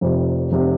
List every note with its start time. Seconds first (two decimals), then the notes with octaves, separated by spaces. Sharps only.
0.01 F1 F2 C3
0.52 F1 C3